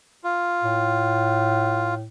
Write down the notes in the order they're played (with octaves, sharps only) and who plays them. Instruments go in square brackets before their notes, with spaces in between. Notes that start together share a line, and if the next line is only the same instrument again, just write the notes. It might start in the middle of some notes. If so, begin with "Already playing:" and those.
[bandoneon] F4
[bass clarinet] A2